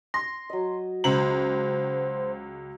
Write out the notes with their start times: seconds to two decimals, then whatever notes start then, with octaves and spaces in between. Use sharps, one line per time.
0.14 C6 A#6
0.50 F#3 D#5
1.04 C#2 C5 A#5 F#7